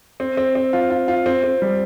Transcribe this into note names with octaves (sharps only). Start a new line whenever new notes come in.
C4
C4
C4
F4
F4
F4
C4
C4
G3